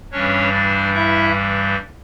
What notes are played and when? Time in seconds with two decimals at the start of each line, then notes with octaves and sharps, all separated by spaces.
0.12 G2 E3 G3 C#4 D4 C#5
0.52 D4 D5
0.93 E4 E5